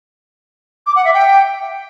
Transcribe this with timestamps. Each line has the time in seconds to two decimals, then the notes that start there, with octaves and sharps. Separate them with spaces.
0.87 D6
0.96 F#5
1.05 E5
1.14 G5